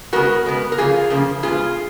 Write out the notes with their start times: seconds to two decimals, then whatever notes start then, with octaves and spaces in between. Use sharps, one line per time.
0.13 C#3 G#3 B3 F#4 A#4
0.45 C#3 G#3 B3
0.72 A#4
0.78 C#3 F3 A#3 F4 G#4
1.10 C#3 F3 A#3
1.43 A#2 G#3 B3 F4 G#4